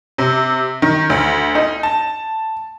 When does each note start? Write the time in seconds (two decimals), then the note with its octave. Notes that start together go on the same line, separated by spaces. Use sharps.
0.18 C3
0.82 D#3
1.10 D2
1.55 D#4
1.83 A5